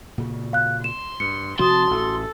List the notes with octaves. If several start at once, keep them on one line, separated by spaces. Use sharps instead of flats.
A#2 C#3
F5 F#6
C6 E7
G2 C#7
C3 F3 C4 F#4 A5 C6 D#6
A1 A4